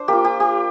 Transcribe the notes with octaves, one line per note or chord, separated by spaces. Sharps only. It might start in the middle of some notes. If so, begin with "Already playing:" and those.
Already playing: D4 C5
A#3 F4 G4
G4
G4